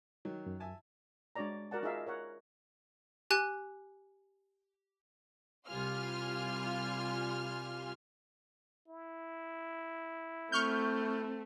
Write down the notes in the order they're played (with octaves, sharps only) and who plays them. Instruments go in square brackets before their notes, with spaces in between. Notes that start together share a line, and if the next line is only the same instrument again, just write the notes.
[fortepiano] D#3 F#3
[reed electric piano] F#2
[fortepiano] E5 G#5 A5
[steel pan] G#3 D4 F#4 C#5 D5 A#5
F#4 A#4 D5 F#5 A5
D#4 F4 G#4 A#4 E5 F5
A#4 C#5 F#5
[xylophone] G4 G#5 F#6
[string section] C2 G3 F4 G#5 C6 F6
[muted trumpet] E4
[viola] A3 [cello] C4 [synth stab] C#6 F6 G6